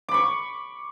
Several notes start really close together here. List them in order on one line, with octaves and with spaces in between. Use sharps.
D6 B5 C#6